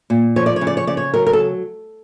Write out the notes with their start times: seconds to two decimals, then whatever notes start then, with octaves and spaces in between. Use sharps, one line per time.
0.10 A#2
0.36 F3 C#5
0.46 D5
0.56 C#5
0.61 C#3
0.67 D5
0.77 C#5
0.87 C#3 D5
0.97 C#5
1.14 F#3 A#4
1.27 A#4
1.33 A4